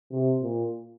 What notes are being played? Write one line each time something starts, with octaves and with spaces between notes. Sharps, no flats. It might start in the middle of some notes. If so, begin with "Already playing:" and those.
C3
A#2